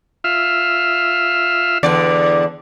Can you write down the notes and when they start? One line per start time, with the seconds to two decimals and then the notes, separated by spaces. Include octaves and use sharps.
0.24 F4 E5 F5
1.83 E2 D3 D5